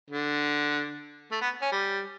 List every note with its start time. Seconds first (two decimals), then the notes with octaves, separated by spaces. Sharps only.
0.11 D3
1.32 A3
1.42 B3
1.62 C#4
1.72 G3